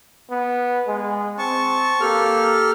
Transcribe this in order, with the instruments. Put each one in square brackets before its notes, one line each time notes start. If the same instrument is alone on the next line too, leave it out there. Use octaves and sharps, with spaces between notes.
[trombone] B3
G#3
[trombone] C4 [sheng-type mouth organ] A5 C#6
[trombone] A#3 [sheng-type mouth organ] G4 A4 F6